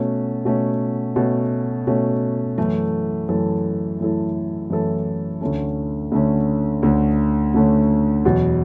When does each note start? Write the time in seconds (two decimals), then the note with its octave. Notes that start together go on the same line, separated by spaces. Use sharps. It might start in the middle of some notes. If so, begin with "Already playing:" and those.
Already playing: B2 A3 C#4
0.45 B2 A3 C#4
1.16 B2 A3 C#4
1.87 B2 A3 C#4
2.58 F#2 E3 A3 E4 A4
3.29 F#2 E3 A3 E4 A4
4.00 F#2 E3 A3 E4 A4
4.70 F#2 E3 A3 E4 A4
5.41 D2 D3 A3 C#4
6.11 D2 D3 A3 C#4
6.83 D2 D3 A3 C#4
7.54 D2 D3 A3 C#4
8.25 E2 B2 F#3